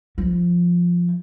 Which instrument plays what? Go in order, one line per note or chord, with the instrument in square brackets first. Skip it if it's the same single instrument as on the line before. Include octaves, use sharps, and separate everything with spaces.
[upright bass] F3